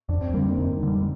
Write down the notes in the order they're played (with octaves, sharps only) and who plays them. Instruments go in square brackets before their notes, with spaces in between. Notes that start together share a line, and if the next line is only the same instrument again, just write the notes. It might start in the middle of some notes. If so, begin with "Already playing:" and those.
[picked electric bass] F2 [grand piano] D4
[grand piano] C4
[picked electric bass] D3 G3 [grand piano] A#3
[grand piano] C4
[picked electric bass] F2 [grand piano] D#4
[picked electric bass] D3 G3